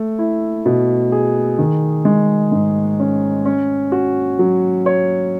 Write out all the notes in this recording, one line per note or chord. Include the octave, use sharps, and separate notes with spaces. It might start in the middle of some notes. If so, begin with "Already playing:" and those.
Already playing: A3
E4
B2
G#4
D#3
G#3
G#2
C#4
C#4
F#4
F#3
C#5